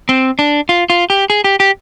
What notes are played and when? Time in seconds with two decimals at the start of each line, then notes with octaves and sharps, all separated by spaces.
0.09 C4
0.39 D4
0.69 F4
0.90 F4
1.10 G4
1.30 G#4
1.44 G4
1.60 G4